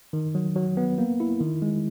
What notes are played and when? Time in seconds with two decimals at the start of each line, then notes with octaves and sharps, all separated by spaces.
0.13 D#3
0.35 F#3
0.56 F#3
0.77 B3
0.98 A#3
1.20 E4
1.41 D#3
1.62 G#3